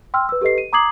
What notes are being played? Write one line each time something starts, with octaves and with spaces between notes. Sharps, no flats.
G5 C6 E6 F6
B4 E6
G4 A4 B4 D#5 C7
D#7
A#5 D6 D#6 G#6 C7 F#7